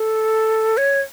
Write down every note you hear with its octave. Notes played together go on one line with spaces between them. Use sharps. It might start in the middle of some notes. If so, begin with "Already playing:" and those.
Already playing: A4
C#5